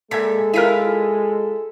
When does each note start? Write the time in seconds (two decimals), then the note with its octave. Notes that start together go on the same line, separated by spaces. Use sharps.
0.11 A#2 G#3 A4 E5 G#6 B6
0.54 E4 F4 A4 A#4 B6 D#7